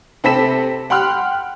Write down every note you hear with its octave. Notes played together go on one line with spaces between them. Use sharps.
C3 C4 A4 B5 B6 E7
F#5 G5 B5 C6 F6 F#6